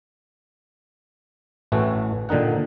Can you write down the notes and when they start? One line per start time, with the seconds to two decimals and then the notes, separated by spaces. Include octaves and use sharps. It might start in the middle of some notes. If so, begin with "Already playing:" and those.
1.72 A1 A2 E3 A3 F#4
2.29 A#2 D3 D#3 D#4 F#5